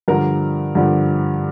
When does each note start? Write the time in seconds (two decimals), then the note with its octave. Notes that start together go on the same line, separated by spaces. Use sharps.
0.08 G2 D3 F3 A#4
0.75 G2 D3 F3